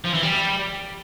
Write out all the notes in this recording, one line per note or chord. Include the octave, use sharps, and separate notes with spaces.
F3
E3
G3